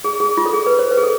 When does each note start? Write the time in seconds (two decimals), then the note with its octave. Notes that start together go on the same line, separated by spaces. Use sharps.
0.04 G#4
0.20 G#4
0.37 F4
0.45 A4
0.53 G#4
0.66 B4
0.79 C5
0.91 B4
0.97 G#4
1.03 A4